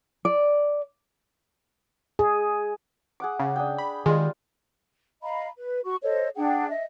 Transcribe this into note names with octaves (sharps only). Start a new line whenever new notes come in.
D5
G#4
G#4 F#5 D6
C#3
D4 G#4 G5
B5
D#3 G3 G#3 F4
D#5 F5 A#5 B5
B4
F#4 C#6
A4 C5 C#5 D#5
D4 G#4 F#5 G5
D#5 E5